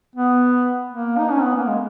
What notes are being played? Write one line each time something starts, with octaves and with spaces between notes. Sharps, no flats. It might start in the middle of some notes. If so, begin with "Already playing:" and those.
B3
A#3
D#4
C#4
B3
A#3
G#3